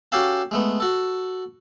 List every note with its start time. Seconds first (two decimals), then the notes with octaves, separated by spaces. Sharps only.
0.12 C#4 F#4 G4 A4 F5 A5
0.51 G#3 A3 B3
0.80 F#4 A4